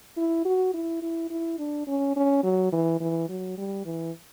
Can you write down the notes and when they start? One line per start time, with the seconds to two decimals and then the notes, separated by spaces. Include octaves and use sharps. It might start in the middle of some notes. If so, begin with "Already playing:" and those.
0.17 E4
0.45 F#4
0.74 E4
1.02 E4
1.31 E4
1.59 D4
1.87 C#4
2.16 C#4
2.44 F#3
2.73 E3
3.01 E3
3.29 F#3
3.58 G3
3.85 E3